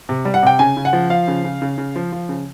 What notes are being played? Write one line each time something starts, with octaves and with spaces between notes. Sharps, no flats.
C3
G3
F#5
C3 G5
C#3 G#5
C#3
F#5
F3
F3 F5
C#3
C#3
C#3
C#3
F3
F3
C#3